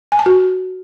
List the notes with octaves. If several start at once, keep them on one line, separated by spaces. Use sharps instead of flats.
G#5
A5
F#4